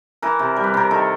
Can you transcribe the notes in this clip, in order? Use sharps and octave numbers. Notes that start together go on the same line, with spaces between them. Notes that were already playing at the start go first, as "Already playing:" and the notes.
E3 A#4
C3
G3
B4
C3 A#4
D#3 A4